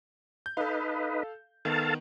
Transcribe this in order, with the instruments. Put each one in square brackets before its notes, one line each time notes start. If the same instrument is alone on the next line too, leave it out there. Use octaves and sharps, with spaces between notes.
[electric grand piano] G6
[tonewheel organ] D#4 B4 [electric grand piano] A4 F5
[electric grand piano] D#3 B3 [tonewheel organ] A4 F5 A5